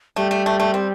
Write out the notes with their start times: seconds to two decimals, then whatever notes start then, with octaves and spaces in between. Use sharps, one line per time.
0.16 G3 A3
0.31 A3
0.46 A3
0.60 A3
0.74 C4